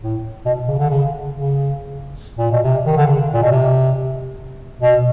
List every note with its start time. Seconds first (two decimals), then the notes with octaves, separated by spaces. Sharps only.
0.02 A2
0.45 B2
0.68 C#3
0.79 D3
0.90 C#3
1.32 C#3
2.38 A#2
2.51 B2
2.63 C3
2.86 D#3
2.97 D3
3.07 C#3
3.33 A#2
3.42 B2
3.51 C3
4.81 B2